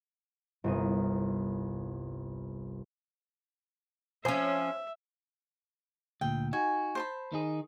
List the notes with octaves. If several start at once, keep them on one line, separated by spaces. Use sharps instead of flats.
G1 C2 D#6
F3 C#4 C5 E5 G#5
D2 A#2 G5
D#4 F#4 G#5
C5 A5 B5
D#3 D#4 G#4